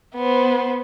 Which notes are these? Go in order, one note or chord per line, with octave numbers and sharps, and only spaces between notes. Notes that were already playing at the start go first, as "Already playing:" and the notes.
B3 C5